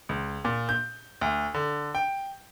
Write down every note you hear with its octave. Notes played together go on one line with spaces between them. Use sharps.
C#2
A#2
G6
D2
D3
G5